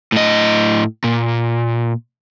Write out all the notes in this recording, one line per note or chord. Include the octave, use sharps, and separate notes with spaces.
A2 D#5
A#2